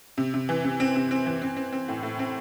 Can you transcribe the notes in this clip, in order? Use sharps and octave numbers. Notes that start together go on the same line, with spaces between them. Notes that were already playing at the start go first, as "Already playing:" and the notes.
C3
C3
E3
C3
C4
C3
C4
E3
C4
C4
C4
A2
A2
C4